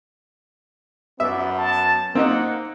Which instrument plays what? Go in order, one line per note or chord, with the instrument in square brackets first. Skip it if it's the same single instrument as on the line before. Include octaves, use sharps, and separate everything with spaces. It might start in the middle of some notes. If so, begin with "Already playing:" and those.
[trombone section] F#2 B3 [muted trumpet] D5 [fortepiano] E5
[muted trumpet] A5
[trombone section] A#3 [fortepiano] C4 D#4 D#5 [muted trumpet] F#5